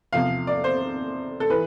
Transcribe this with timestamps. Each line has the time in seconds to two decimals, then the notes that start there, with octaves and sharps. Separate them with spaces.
0.13 E2 C3 F3 F5
0.47 D5
0.64 C5
1.40 A4
1.50 E3 B4